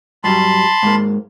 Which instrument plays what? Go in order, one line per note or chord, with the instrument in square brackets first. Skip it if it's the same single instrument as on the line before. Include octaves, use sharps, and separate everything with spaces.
[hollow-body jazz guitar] G2 F#3 G3 [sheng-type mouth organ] A5 B5 C6
[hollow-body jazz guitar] G#2 G#3 A#3